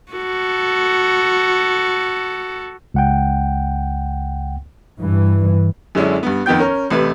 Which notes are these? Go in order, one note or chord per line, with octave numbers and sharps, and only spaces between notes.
F#4 A4
C#2 F#5 G5
G2 E3
F#2 D3 G#3 C#4 D4 E4
G2 B3
F2 D#3 B3 G5 G6
C#4 A#4 C#5
A1 C3 A3 B4